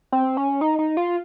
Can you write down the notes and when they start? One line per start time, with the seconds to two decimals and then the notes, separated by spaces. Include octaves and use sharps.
0.12 C4
0.37 C#4
0.61 D#4
0.79 D#4
0.97 F4